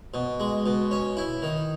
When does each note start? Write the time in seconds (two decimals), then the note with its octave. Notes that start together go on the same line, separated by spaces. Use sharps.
0.14 B2
0.40 G#3
0.66 B2
0.91 C#4
1.17 E4
1.42 D#3